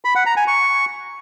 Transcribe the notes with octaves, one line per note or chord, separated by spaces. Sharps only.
B5
F#5
A#5
G#5
C#6